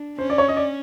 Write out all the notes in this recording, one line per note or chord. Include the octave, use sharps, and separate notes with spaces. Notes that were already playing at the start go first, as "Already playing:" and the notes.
Already playing: D4
C#4 C5
D5
C#5
D#5
D5